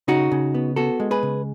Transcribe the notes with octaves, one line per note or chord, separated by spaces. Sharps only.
C#3 D#4 F#4
C#3
B3
B3 F#4 A4
G#3
G#4 B4
C#3